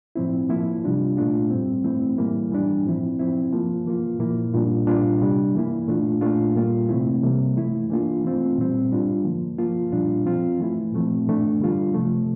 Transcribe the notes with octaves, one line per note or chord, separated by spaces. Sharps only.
A2 F3 C4 E4
F3 A#3 E4
C3 G3 D4 F4
A#2 A3 D4 F4
A2 G3 C4
E3 A3 C4 E4
A2 E3 G3 A#3 E4
E3 G3 D4
A2 F3 C4 E4
F3 C4 E4
F3 A#3 F4
E3 A#3 F4
A#2 F3 A#3 E4
A#2 G3 D4 F4
A#2 G3 D4 F4
C3 G3 D4
E3 A#3 E4
A#2 A3 D4 F4
A#2 A3 D4 F4
A#2 G3 A#3 F4
C3 E3 A3 C4 E4
C3 G3 A#3
E3 A3 E4
E3 A#3 D4 F4
E3 A3 C4 F4
A#2 G3 C4
A2 G3 D4 F4
D3 F3 A#3
F3 A#3 F4
A#2 G3 D4 F4
F3 C4 F4
E3 A3 E4
A#2 F3 A3 C4
A2 E3 A3 D4
D3 G3 D4 F4
C3 F3 A3